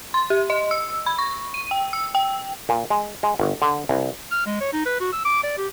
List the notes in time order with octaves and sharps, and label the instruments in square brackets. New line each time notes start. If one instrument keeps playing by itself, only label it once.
[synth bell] C6
G4
D#5
E6
B5
C#6
D#7
G5
E6
G5
[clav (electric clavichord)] A#2
G#3
G#3
G1
D3
C2
[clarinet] F6
G#3
C#5
D#4
B4
F#4
E6
D6
D5
G4